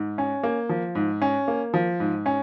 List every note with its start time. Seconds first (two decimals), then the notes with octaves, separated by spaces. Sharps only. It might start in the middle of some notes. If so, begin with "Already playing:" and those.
Already playing: G#2
0.18 C#4
0.43 A#3
0.69 F3
0.95 G#2
1.22 C#4
1.48 A#3
1.74 F3
2.00 G#2
2.26 C#4